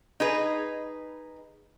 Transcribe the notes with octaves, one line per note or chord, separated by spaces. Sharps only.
D#4 G#4 B4